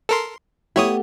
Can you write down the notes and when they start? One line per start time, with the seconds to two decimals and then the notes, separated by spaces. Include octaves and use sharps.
0.09 A4 A#4 C6
0.76 A3 B3 E4 G4 C#5 D#6